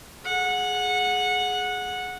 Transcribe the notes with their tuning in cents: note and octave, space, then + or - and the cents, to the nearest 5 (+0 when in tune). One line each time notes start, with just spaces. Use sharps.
G#4 +10 F#5 -15